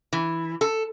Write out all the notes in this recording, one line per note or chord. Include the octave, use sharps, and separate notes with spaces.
E3
A4